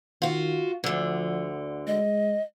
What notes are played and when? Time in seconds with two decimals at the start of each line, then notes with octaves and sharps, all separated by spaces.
0.22 D#3 F4 F#4
0.84 D2 D3 F3
1.87 G#3 D#5